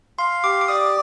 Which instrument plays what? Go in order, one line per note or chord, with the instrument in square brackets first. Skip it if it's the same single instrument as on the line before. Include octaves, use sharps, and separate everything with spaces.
[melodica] F5 [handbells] C6
[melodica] G4 [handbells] D6
[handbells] D6
[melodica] D5 [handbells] D#6